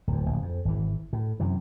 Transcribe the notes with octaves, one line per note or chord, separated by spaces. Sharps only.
D1 D#2
D1 A#1
F2
G#1 E3
A2
F#2 C3 E3